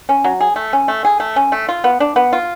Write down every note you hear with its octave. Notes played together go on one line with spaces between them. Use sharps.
C#4
F#3
G#4
A3
C#4
A3
G#4
A3
C#4
A3
F4
B3
D4
B3
F4